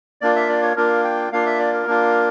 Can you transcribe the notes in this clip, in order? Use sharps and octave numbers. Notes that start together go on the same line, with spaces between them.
A#3 D4 F4 D5
E5
D5
C#5
A#3 D4 F4 A#4
G5
A#3 D4 F4 F5
E5
D5
A#4
A#3 D4 F4